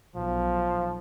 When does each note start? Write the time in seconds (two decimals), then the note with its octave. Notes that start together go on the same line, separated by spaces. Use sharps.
0.16 B1 F3